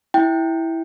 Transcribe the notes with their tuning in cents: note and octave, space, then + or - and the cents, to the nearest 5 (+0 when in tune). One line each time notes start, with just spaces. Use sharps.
E4 -5 G5 +0